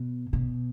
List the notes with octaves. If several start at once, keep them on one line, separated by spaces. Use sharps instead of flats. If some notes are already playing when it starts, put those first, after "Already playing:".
Already playing: B2
B2